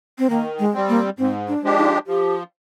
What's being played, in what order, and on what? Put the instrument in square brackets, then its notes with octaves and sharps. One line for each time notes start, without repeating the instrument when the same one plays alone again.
[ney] C4
[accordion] D#3 [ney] A#3
[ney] G#3
[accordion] G3 C4
[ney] A#3
[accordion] G#2 [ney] C4
[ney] D4
[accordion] F3 G#3 D4 G4
[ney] D#4
[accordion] F3 [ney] G4